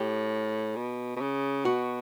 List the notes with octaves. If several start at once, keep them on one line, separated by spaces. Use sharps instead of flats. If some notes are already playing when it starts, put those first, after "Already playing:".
Already playing: A2 G4
B2
B2
C#3
B2 F#4